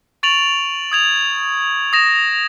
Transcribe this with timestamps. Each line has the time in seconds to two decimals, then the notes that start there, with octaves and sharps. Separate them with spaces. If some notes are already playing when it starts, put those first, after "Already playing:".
0.23 C#6 A6 D7 F7 F#7
0.92 D#6 G#6 F7
1.93 D#6 A#6 E7